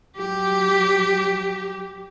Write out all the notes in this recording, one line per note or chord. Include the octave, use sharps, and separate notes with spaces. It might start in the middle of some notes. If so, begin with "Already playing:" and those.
F#3 G4